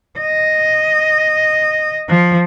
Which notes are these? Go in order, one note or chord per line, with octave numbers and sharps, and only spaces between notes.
D#5
F3